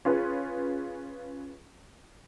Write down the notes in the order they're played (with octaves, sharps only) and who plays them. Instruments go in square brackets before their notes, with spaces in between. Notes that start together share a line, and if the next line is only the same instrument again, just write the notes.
[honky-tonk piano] C#4 F4 G#4 B4